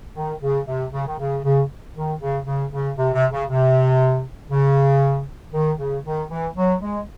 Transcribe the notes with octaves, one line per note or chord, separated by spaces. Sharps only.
D#3
C#3
C3
C#3
D#3
C#3
C#3
D#3
C#3
C#3
C#3
C3
C3
C#3
C3
C#3
D#3
C#3
D#3
E3
F#3
G#3